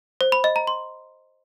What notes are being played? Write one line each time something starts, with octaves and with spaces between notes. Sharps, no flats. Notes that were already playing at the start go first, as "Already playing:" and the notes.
C5
B5
D#5
A#5
C6